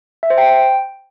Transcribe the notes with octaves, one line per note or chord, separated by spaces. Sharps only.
E5
C5
G5